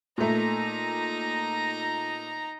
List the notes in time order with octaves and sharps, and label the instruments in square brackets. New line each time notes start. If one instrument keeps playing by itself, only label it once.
[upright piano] A#2 A3 [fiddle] D#4 A#5